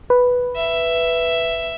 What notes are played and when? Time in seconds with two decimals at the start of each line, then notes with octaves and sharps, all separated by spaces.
0.10 B4
0.56 E5